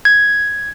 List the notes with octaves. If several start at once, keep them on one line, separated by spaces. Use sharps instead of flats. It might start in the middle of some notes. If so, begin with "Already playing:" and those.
G#6